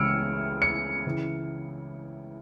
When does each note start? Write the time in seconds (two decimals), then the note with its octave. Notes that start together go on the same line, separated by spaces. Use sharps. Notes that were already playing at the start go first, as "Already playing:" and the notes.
Already playing: C#2 C#3 E3 E6 F6 C#7 D7
0.62 C#7
1.07 C#3 E3